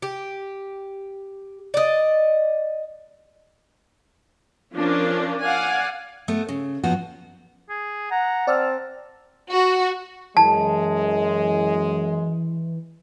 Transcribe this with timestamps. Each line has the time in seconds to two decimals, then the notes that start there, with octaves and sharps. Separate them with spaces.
0.02 G4
1.74 D5 D#5
4.75 F3 C#4 D4 A#4
5.43 D5 F5 F#5 G#5
6.28 A3 B3
6.49 C#3
6.83 F#2 A#2 F3 B3 F#4
7.69 G#4
8.11 F#5 A#5
8.47 C4 D5 A5 E6 F6
9.49 F#4
10.37 F#2 E3 G#3 A5